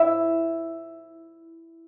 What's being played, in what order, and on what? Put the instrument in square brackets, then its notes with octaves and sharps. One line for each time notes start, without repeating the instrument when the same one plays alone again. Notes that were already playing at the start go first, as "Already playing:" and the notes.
Already playing: [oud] E4